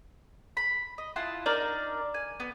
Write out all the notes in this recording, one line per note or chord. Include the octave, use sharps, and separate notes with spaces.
B5
D#5
E4 F4 F#5 A5
D4 D#4 A#4 D5
G#5
B3